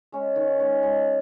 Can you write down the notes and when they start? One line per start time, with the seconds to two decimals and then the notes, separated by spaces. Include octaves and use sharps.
0.12 G#3 C#4
0.36 D#3
0.60 G#3 C#4
0.83 G#3